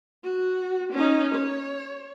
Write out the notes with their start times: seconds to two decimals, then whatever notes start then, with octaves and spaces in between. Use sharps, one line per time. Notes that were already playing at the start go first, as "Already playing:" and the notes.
0.24 F#4
0.93 C#4 D#4
1.35 C#5